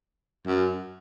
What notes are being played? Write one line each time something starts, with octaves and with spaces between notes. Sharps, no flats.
F#2